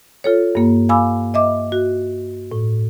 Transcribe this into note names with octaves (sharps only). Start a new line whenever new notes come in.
F4 A4 C#5
G2 A#3
F5 G#5 B5 D6 E6
D#5 E5 D6
F#4
A2